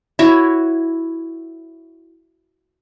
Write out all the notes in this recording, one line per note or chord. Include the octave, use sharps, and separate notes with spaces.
E4 F#4 C#5